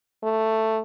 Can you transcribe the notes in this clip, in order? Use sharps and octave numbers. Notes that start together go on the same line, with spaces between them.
A3